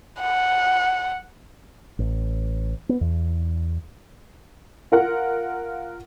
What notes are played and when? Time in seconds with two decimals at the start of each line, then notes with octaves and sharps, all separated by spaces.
0.21 F#5
1.99 A1
2.89 B3
3.01 E2
4.92 F4 A#4 F#5